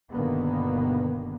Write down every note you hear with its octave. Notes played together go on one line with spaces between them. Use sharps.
G1 B2 D3 D#3 A#3 B3